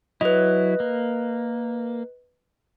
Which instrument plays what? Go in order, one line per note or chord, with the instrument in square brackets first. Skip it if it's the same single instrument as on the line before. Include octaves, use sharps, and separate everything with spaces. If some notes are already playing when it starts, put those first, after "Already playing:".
[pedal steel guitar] F#3 E4 [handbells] B4 D#5
[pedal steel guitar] A#3